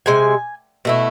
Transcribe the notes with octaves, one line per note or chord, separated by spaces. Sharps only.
C3 G#3 G#5
B2 A3 E4